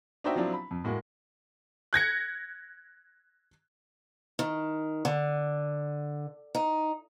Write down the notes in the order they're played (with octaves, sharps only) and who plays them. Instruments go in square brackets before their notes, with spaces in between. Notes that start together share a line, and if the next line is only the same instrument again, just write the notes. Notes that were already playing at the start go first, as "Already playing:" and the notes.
[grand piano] D4 D#4 F#4 C5 E5 G5
F3 F#3 C4 D4 E4
B5
F2
A2 G#3 A#3 F#4
[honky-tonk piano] F#6 G#6 A#6 C#7
[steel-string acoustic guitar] D#3
D3
D#4